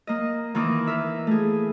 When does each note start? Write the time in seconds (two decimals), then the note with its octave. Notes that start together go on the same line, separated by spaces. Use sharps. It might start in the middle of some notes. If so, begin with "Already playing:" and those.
0.07 A#3 D#5
0.55 D#3 E3 A#3 D#5 D6
0.87 A#4 E5
1.27 A3 G#4